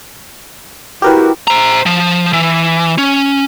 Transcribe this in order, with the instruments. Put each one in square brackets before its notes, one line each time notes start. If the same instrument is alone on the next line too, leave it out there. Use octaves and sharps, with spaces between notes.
[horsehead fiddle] E4 F#4 [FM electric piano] G4 A#4 B4
[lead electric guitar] C5 A#5
F3
E3
C#4